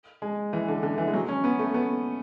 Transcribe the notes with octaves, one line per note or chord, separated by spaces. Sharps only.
G#3
E3
D3
D3
E3
G#3
F#3
C#4
B3
A3
B3